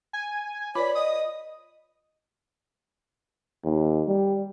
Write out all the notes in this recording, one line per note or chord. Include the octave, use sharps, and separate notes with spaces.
G#5
F4 B4 C#5 D5 B5
D#5 D#6
D#2
G3